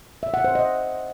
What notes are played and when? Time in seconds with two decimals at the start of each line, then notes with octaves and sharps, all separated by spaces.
0.23 E5
0.34 F#5
0.44 C5
0.55 D#5